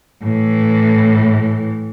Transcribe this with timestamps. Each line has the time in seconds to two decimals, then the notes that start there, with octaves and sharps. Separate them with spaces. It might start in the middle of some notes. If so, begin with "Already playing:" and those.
0.23 A2 E3